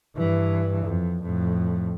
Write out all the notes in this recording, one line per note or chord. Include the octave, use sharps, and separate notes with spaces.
G2 E3
F2
F2 A2